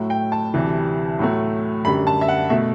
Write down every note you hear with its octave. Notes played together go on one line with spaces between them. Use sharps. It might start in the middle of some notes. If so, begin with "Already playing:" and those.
Already playing: A2 F#3 A3
G5
A5
D2 C3 E3 G3
A2 F#3 A3
F#2 D3 G3 B5
A5
E5
F#5
B2 A3 E5